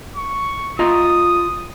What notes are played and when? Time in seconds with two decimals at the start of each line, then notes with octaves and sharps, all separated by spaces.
0.16 C#6
0.79 F4 D#5 A#5 D#6